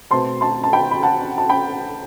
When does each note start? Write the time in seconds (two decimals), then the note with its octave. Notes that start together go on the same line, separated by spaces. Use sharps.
0.11 B2 A3 C4 A5 C6
0.41 A5 C6
0.64 A5
0.73 G5 B5
0.91 B5
1.03 F#5 A5
1.38 A5
1.49 G5 B5